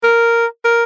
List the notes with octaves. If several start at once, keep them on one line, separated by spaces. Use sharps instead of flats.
A#4
A#4